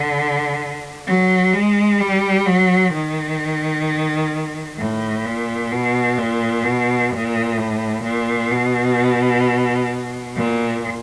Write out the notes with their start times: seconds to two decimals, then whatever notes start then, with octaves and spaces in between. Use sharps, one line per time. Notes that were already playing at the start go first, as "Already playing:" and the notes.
Already playing: D3
1.07 F#3
1.53 G#3
2.00 G3
2.46 F#3
2.93 D#3
4.79 A2
5.26 A#2
5.72 B2
6.18 A#2
6.64 B2
7.11 A#2
7.58 A2
8.04 A#2
8.51 B2
10.36 A#2